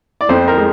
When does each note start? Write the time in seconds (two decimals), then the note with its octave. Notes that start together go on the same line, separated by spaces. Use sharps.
0.21 D5
0.29 F2 C5
0.48 A#4
0.58 G#3